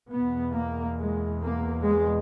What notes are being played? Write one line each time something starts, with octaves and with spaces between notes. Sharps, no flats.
E2 B2 B3
A#3
G#3
A#3
G#3